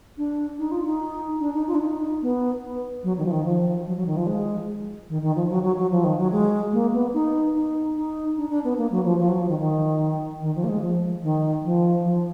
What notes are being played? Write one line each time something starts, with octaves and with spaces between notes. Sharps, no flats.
D4
D#4
F4
D#4
D4
D#4
F4
D4
D#4
B3
F#3
D#3
F3
D#3
F3
F#3
F#3
D#3
F3
G#3
D#3
D#3
F3
F#3
F#3
F#3
F3
D#3
F#3
G#3
A#3
B3
D#4
D#4
D#4
D4
D4
B3
A#3
F#3
F3
F3
F#3
F3
D#3
D#3
D#3
F3
A#3
G#3
F3
D#3
F3
F3